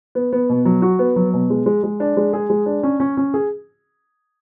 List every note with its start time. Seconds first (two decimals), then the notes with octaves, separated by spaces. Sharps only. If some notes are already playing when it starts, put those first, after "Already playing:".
0.15 B3
0.33 B3
0.49 B2
0.65 F#3
0.82 F#4
0.99 B3
1.16 F#3
1.33 B2
1.50 G#3
1.66 G#3
1.84 G#3
2.00 D4
2.17 G#3
2.33 G#4
2.50 G#3
2.66 D4
2.83 C#4
3.00 C#4
3.17 C#4
3.34 G#4